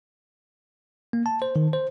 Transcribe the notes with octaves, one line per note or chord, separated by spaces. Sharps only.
A#3
A5
C5
D#3
C5